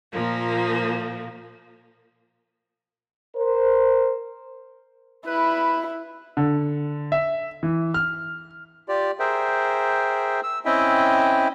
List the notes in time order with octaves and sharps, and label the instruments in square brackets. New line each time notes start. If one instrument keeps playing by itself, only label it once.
[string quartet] A#2 F3 A#3
[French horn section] A#4 C5
[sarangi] E4 [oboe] B4
[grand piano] D3
E5
E3
F6
[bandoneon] F4 G4 D5
G#4 A#4 C5 E5 G5
E6
C4 C#4 E4 D#5 E5 G5